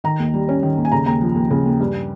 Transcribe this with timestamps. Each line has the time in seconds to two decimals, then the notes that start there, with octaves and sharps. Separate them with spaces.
0.04 D#3 A#5
0.19 D#2
0.34 G3
0.49 C#4
0.63 D#3
0.78 D#2
0.85 G#5
0.92 C#3 A#5
1.06 D#2 A#5
1.22 F3
1.35 D#2
1.50 C#3
1.66 D#2
1.80 G2